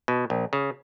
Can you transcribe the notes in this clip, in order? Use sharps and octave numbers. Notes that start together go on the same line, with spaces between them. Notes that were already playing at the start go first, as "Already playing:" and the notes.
B2
A#1
C#3